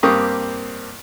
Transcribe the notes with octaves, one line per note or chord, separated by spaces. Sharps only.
G2 A#3 C4 G4 C#6 D#6